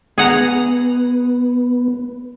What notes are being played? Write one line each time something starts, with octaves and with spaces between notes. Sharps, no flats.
B3 G#4 F#5 A#5